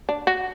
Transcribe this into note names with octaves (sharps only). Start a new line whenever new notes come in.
D4
F#4